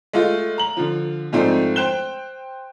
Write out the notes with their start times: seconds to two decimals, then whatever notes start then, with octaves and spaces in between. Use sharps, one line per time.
0.13 G#3 A3 F4
0.58 A#5 F#7
0.77 D3 F3
1.32 F2 G#2 F3 A3 C4 D4
1.76 C5 G5 F#6 E7 G7